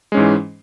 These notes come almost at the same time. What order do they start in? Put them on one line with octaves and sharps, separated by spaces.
G#3 C#4 G#2 E3